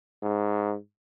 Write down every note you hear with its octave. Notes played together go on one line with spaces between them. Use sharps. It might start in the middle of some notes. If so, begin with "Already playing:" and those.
G#2